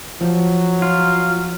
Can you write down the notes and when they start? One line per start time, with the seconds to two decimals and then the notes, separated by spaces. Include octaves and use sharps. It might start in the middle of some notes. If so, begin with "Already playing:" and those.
0.21 F3 F#3
0.82 F4